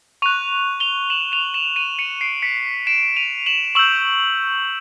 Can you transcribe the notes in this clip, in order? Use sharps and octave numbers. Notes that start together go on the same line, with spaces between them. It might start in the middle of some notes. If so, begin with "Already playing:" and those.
C#6 F#6 D#7 F7
F7 G7
E7 F#7
D#7 F7
E7 F#7
D#7 F7
C#7 D#7
C7 D7
B6 C#7
D7 E7
D#7 F7
E7 F#7
C#6 E6 G6 E7 F#7